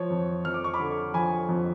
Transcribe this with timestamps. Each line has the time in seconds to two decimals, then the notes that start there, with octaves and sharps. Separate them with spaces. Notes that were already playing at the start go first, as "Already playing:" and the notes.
Already playing: F3 C#5
0.10 F2
0.45 F2 F6
0.54 D6
0.64 C#6
0.74 B5 D6
0.80 D3
1.14 F3 G#5 B5
1.48 F2